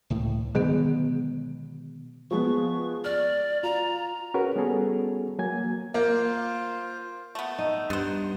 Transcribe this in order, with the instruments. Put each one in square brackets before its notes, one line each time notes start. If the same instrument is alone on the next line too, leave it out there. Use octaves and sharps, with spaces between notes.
[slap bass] C#2 A2
[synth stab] G#2 [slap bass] B2 F#3 G#3 [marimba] D3 D#3 B3
[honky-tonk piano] F3 G#3 B3 [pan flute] C#6
[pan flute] D5 [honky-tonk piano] F6
[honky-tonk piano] F4 [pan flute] A#5
[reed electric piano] C#4 F#4 G#4 A#4 B4
G3 B3 C#4 F#4 G#4 A4
F#3 A#3 G#5 G#6
[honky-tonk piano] A#3 [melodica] F4 C5
[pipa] A3 B3
[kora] D#4
[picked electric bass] G2 [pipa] B3 C5